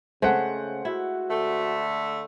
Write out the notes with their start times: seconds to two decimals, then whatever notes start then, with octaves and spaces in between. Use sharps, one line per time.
0.22 C#3 G#3 A3 C5 F#5
0.85 E4 F#4
1.30 D3 A3